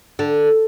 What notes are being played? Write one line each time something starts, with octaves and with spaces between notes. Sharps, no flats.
D3